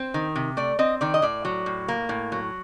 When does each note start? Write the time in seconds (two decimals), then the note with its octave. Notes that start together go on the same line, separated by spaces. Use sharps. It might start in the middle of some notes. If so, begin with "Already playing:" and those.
Already playing: C4 C5
0.14 D#3
0.36 C3
0.57 A3 D5
0.79 C4 D#5
1.01 D#3 D5
1.14 D#5
1.22 A2 D5
1.45 F#3
1.66 A2
1.88 A#3
2.09 A2
2.32 F#3